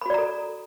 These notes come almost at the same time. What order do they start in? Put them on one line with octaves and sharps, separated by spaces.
B5 F#4 D5 A#5 A4